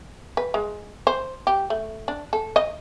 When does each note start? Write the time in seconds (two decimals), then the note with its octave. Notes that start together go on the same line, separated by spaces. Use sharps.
0.37 B4
0.54 G#3
1.07 C5
1.47 G4
1.70 A3
2.08 D4
2.33 A4
2.56 D#5